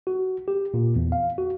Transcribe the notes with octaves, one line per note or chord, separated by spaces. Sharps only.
F#4
G4
A#2
E2
F5
F#4